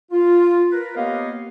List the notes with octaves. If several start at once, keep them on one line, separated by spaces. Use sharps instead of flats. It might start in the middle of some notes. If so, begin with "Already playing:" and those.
F4
A#4 B4
A#3 B3 G4 C#5 D#5 F5